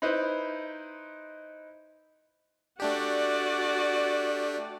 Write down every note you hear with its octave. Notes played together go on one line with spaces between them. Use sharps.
D#4 E4 B4 C5
A3 D4 F#4 G4 D5